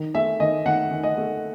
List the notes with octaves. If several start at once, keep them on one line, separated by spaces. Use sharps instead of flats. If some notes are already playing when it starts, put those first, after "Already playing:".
Already playing: D#3
A3 E5
D#3 D#5
D#3 F#5
D#3
D#5
A3